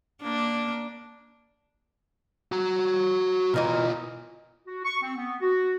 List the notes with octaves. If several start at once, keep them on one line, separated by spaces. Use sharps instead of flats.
A#3 D4
F#4 A#5
B2 E3 D#4 F4 A#4
F#4
C#6
C4
B3
F#4